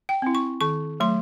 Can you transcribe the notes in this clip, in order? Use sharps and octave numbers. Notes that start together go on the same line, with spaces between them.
G5
C4 E4
C#6
D#3 C#6
F#3 A3 C6